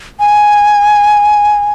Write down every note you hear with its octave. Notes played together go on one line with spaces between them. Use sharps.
G#5